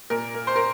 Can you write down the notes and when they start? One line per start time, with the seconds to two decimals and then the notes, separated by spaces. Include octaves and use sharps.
0.10 A#2 A#4
0.34 A#3
0.47 C5
0.56 A#4